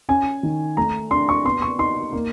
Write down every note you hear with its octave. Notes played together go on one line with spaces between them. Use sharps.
C#4 G#5
D#3
A3 A#5
D4 C6
C#6
B3 C6
C#6
D#4 C6
A#3